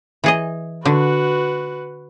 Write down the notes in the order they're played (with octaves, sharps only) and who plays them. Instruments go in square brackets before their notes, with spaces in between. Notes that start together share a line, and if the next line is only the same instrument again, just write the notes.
[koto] E3 G#4 D#5
[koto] D3 [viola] F#4 B4